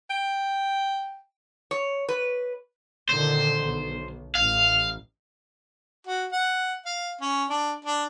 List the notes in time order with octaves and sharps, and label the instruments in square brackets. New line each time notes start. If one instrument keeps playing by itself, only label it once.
[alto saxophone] G5
[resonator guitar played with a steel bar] C#5
B4
[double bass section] A#2 D3 D#3 [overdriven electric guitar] C5
[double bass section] B1
[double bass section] A1 [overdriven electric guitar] F5
[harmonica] F#4
F#5
F5
C#4
D4
D4